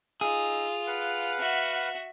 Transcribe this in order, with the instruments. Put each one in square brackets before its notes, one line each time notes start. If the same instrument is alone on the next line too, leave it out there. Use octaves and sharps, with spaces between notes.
[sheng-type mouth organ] D#4 E6 [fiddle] F4 [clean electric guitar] G#4
[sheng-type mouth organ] B4 F5 F#5
[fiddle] F#4 E5